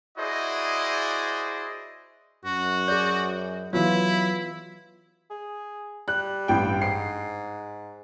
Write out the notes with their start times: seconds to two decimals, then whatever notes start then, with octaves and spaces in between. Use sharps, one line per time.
0.18 E4 F#4 G#4 C5 D5 D#5
2.45 F#2 F#4
2.88 G#4 D5 G6
3.73 E3 F#3 B3 E4 F4
5.30 G#4
6.08 G3 F#6
6.48 A1 G2 G5
6.81 G#2 C7